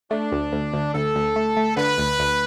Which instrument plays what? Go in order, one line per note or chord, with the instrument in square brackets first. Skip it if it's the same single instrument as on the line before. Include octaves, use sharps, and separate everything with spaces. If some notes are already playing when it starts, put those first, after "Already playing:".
[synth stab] A3 [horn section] D4
[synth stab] D2
D2
D2
[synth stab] D2 [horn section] A4
[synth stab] D2
A3
A3
[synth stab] D3 [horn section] B4
[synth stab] D2
D2